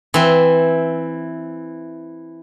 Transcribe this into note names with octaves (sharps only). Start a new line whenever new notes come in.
E3 C4